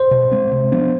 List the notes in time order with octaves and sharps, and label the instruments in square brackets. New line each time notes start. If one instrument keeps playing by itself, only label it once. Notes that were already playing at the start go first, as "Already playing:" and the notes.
Already playing: [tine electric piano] C5
[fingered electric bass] B2
G#3 C4
C3
F3 B3 D4